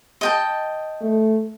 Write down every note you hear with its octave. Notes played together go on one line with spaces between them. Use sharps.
D#5 G5 A5
A3